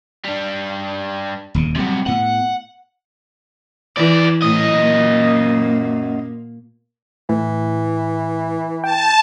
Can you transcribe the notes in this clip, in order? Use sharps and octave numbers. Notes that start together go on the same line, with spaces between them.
G3 D4
D#1 D#2 C#3
C3 F#3 G3 B3
A2 B3 F#5
E2 E3 D5
F#2 A2 D#5
A#2 A#3
A2 E3
G5 A5